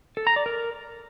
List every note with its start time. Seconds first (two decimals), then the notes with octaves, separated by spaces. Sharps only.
0.17 A4
0.27 A#5
0.36 D5
0.46 A#4